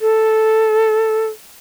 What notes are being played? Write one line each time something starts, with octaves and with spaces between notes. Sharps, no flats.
A4